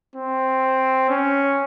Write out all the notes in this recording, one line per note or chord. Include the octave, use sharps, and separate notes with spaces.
C4
C#4